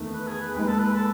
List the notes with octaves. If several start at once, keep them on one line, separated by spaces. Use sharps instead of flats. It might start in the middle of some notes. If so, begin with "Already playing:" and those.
Already playing: E2 D#3 A3
B4
G#4
B4
D#2 D#3 G#3 D#4 B4
A4
B4
A4